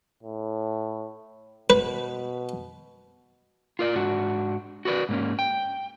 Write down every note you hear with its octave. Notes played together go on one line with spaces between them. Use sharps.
A2
B2 B4
F4 A#4 D5
G#2 D4 F#4
F#4 A#4 B4 D5
G#2 A#3 C#4
G5